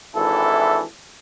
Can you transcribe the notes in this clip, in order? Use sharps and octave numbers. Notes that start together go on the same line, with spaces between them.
G#1 E3 D4 E4 A4